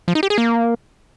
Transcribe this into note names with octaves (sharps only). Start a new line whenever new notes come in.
F3
D#4
G4
G#4
A#3